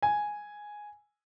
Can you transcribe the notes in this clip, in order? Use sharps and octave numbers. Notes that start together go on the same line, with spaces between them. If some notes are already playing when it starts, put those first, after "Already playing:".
G#5